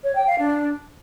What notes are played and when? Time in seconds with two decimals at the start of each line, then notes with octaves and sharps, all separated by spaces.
0.04 C#5
0.15 G5
0.27 F5
0.39 D4